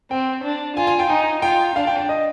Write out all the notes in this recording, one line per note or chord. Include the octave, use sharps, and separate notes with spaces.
C4 G5
D4
F4 G#5
G#5
G5
D#4 G#5
F4 G5
D4 F5
G5
G5
D#5